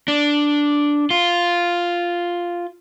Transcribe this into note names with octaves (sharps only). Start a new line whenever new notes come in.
D4
F4